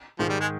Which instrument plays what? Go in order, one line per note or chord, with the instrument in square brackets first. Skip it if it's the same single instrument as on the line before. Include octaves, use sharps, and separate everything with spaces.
[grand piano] G#2 D#3 G#3 [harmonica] F3
[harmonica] G3
G#3